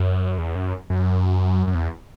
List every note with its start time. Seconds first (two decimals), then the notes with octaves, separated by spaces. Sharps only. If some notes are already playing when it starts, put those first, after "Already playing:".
Already playing: F#2
0.38 E2
0.55 F#2
0.90 F#2
1.67 F#2
1.75 E2